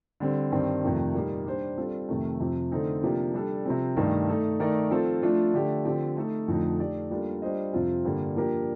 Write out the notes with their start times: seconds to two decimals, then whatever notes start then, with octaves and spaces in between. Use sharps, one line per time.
0.20 D3 G3 C4
0.52 G2 D#3 G3 C4
0.83 F2 C3 D#3 A3
1.14 A#2 G3 A#3 D#4 G4
1.46 G3 D4 G4 C5
1.77 G3 C4 F4 A4
2.08 F2 C3 D#3 A3
2.40 F2 C3 F3 C4 G4
2.71 D3 A3 C4 D#4 A4
3.03 C3 F3 A#3 D4 G4
3.34 G3 D4 A4
3.65 C3 F3 C4
3.97 G2 D#3 A3 D#4
4.28 A3 D#4 A4
4.60 D#3 A3 D#4 A#4 D5
4.91 F3 C4 F4 A4
5.22 F3 A3 D4 F4
5.53 D3 A3 D4 G4
5.85 D3 F3 C4 G4
6.17 A3 D#4 A4
6.48 F2 D3 F3 A3 D#4
6.79 A3 D#4 G4 D5
7.11 G3 A#3 D4 F4 A4
7.42 G3 D4 F4 C5 D#5
7.73 F2 C3 F3 C4 F4
8.04 G2 D3 G3 A#3
8.36 F3 A#3 D4 G4 A#4